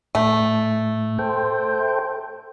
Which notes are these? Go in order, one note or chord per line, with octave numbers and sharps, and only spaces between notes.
A2 A3
A4 C5 G5